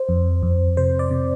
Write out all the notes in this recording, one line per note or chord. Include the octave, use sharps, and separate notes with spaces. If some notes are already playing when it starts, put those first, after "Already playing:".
Already playing: C5
F2
F2
C3 C5
D5
C3